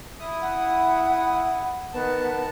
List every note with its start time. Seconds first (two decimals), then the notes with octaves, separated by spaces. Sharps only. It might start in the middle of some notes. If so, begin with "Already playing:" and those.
0.20 E4 D#6
0.42 F#5
1.93 D#3 B3 A5